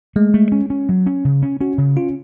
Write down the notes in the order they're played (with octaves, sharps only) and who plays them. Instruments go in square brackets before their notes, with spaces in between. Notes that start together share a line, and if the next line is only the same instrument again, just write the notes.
[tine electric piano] G#3 [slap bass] A3
[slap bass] A3
C#4
C#4
F#3
C#4
C#3
C#4
[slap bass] C#4 [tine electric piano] F#4
[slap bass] C#3
[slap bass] C#4 [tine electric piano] F4